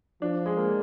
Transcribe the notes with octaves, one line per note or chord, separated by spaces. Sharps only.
F3 D4
G#3
A#3